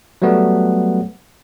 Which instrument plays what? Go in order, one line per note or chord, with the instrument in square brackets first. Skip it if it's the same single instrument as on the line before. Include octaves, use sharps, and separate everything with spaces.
[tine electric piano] F#3 G3 A3 B3